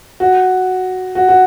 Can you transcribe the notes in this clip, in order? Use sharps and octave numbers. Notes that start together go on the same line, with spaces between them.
F#4
F#4
F#4